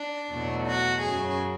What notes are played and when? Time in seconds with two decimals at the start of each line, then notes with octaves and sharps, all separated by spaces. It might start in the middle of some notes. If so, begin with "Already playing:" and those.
Already playing: D4
0.30 E2 B2 F#3 A3
0.66 F#4
1.02 F#2 C#3 F#3 G#4